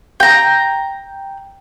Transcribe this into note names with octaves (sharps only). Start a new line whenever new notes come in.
G5 A#5